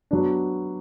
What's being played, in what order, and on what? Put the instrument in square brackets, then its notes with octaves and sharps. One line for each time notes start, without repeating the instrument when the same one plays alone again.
[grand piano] F#3 B3 D4